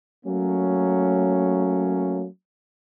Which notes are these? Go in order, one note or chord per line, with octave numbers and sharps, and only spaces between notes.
F#3 A3 A#3 C#4